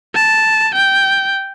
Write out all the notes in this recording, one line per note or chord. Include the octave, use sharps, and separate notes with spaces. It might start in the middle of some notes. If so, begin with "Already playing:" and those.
A5
G5